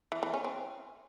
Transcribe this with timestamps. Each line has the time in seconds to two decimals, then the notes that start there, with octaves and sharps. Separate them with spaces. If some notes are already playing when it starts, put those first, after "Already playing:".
0.12 E3
0.23 E3
0.34 C#4
0.44 C4